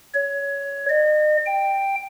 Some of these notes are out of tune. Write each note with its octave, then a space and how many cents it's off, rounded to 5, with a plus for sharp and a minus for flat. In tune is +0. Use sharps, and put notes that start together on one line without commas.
C#5 +15
D#5 -40
G5 +5